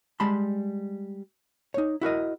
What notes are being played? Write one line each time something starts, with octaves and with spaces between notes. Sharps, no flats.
G3 G#3 A5 B5 C6
D#4 C#5
E4 F#4 A#4 D#5